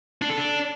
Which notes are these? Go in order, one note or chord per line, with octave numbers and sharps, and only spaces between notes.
D4
A4
D4